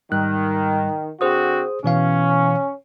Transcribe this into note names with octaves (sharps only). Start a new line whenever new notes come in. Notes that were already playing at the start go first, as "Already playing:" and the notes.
G#2 D#3 G3 F#6
D3 C4 F#4 G#4 C5 D#6
B2 E3 C#4 F5